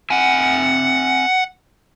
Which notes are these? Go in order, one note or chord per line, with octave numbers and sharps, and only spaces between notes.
C4 E5 F#5 G#5